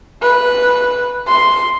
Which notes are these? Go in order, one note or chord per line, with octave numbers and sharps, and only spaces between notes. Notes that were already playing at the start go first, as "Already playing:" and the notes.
B4
C6